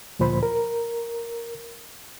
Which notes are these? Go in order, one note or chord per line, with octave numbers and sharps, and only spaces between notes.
D2 A#2 F3 C5 B5
A#4